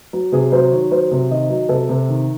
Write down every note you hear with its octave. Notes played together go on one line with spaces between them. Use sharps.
F#3
C3 G#4
F#3 C5
D#3 C#5
F#3 C5
C3
D#3 D#5
F#3
C3 A4
C3
D#3